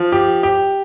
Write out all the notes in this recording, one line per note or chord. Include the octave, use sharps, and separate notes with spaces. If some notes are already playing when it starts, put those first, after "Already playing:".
Already playing: F3
G4
G4